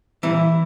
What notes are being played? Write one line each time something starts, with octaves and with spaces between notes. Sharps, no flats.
A#2 E3 G3 E4